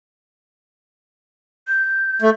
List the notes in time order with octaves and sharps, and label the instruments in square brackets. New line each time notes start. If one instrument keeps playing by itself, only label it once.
[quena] G6
[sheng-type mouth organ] A3